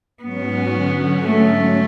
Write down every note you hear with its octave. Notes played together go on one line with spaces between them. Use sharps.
G#2 F#3 B3 C#4 F#4
D3 F#3 C#4 F#4
G#2 F#3 A3 C#4